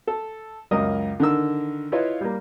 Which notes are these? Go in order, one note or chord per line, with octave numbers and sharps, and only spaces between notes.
A4
C#2 F#2 A#4 D#5 D#6
D3 D#3 A#4 E6
E4 F4 B4 C#5 D#5 F5
G3 A#3